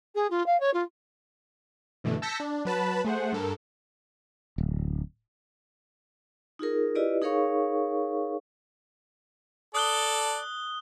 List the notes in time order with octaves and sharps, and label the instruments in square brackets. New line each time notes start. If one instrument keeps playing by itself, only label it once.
[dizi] G#4
F4
F5
C#5
F4
[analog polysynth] G2 B2 D3 E3 A3
A5 E6 G6 A#6 B6 C#7
D4
F#3 B4 A5 B5
A3 G#4 C5 F#5
G2 A4 A#4
[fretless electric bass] D1
[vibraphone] D#4 F4 G#4 A#4
E4 F4 G4 B4 D5 D#5
D#4 G#4 A#4 C#5 F5 C#6
[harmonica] A4 D5 [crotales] D#6 F#6 G7